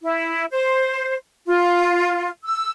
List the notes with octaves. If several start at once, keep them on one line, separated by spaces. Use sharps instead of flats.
E4
C5
F4
E6